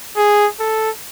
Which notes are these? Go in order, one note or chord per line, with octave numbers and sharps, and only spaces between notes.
G#4
A4